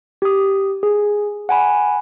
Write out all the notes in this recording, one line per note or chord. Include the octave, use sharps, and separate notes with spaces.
G4 D#6
G#4
F#5 G#5 B5